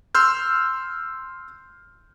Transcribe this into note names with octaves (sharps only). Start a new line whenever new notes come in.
C6 E6 F6 G6